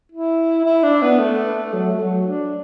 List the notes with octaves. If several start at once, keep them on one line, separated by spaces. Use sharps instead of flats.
E4
E4
D4
B3
A3
F#3
A3
F#3
D4